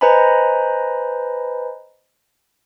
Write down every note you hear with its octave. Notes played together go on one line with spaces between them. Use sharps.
B4 C5 D#5 G#5 A#5 B5